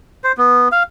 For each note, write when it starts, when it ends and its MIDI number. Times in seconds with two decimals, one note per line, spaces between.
0.24 0.32 72
0.38 0.68 59
0.72 0.83 77